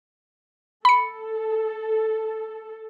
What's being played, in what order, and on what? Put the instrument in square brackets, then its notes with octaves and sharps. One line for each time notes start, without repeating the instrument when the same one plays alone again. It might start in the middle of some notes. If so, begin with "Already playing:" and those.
[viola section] A4 [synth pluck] B5 C#7